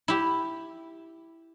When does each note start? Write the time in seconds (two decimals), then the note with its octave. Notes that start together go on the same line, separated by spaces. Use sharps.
0.08 E4 G4